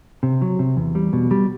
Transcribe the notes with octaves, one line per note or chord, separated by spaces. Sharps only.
C3
F#3
C3
E2
G3
B2
G3